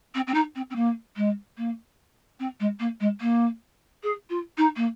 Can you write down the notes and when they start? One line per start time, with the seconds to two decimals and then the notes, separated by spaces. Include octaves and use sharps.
0.14 C4
0.27 C4
0.34 D#4
0.55 C4
0.70 C4
0.75 A#3
1.16 G#3
1.57 A#3
2.39 C4
2.60 G#3
2.79 A#3
3.00 G#3
3.20 A#3
4.03 G#4
4.29 F4
4.57 D#4
4.76 A#3